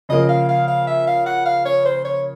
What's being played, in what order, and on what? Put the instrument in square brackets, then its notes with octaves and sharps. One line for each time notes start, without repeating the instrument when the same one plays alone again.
[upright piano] C#3 F3 A#3 [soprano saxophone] D#5
[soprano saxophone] F5
F5
F5
E5
F5
F#5
F5
C#5
C5
C#5